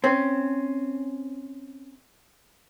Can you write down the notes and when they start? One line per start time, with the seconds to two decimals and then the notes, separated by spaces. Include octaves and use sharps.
0.04 C4 C#4